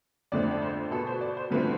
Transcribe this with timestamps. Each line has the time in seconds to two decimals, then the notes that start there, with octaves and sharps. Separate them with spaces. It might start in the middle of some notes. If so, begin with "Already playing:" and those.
0.32 F2 D3 A3 C4 D5
0.51 D5
0.62 C5
0.91 B2 B3 A4
1.00 B4
1.07 C5
1.21 D5
1.37 C5
1.51 G2 D3 F3 A3 C4 B4